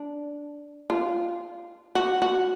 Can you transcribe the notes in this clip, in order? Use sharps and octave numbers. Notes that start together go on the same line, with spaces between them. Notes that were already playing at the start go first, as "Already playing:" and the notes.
Already playing: D4
F4
F#4
F#4